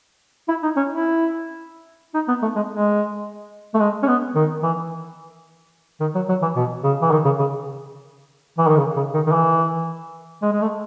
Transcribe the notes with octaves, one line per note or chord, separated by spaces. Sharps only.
E4
D#4
C#4
E4
D#4
B3
A3
G#3
G#3
A3
G#3
C#4
B3
D#3
E3
D#3
F#3
F#3
E3
B2
C#3
E3
D#3
C#3
C#3
E3
D#3
C#3
C#3
D#3
D#3
E3
G#3
G#3
A3